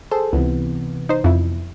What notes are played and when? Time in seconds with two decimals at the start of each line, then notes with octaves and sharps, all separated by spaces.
0.11 G#4 A4 C5
0.33 C#2 C3 E3 B3
1.09 D#4 C5
1.24 F2 E4